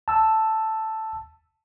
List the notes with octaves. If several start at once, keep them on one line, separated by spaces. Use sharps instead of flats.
A5 E6